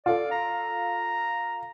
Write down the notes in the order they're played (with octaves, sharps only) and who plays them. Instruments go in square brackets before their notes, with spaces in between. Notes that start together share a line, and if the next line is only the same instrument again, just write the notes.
[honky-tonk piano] F4 A4 [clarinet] D5
[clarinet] A#5